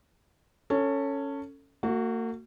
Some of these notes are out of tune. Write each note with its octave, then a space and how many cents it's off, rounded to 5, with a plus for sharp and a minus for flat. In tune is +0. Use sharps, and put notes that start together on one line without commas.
C#4 +0 A4 +20 C#5 +0
A#3 -40 F#4 +0